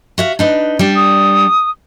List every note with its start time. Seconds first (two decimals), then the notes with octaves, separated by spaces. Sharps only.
0.18 F#4 E5 F5
0.39 D4 D#4 B4
0.79 G3 D4
0.96 D#6